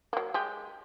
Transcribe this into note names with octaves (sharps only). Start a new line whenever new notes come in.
F#3 A#3
G#3 G4